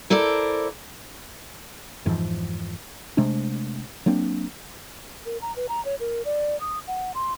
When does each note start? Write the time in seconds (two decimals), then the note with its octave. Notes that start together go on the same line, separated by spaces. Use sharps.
0.10 E4 A4 A#4 C5 D5
2.06 F2 G#2 E3 F3
3.17 C3 G#3 A3 D4
4.06 F#3 A#3 C4 D4
5.26 A#4
5.42 A#5
5.56 B4
5.69 A#5
5.85 C#5
6.00 A#4
6.25 D5
6.61 D#6
6.87 F#5
7.15 C6